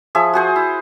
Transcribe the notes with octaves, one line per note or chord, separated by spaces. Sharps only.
F3 G#4 E5
F#4 G#4 C5
E4